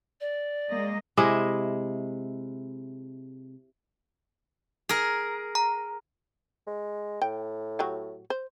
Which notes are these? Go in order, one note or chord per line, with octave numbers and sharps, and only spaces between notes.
D5
G#3 A#3 D#5
C3 G#3 E4 D#5
G#4 A#4
A#5
G#3
A2 G5
F#3 F#4 G4
C5